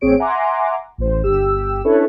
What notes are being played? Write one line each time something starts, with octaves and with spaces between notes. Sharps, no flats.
A1 C4 G#4 C#5 D7
E5 F#5 G#5 A#5 C6 D6
A1 C5
G1 G4 E6
C#4 D4 E4 A4 B4 C#5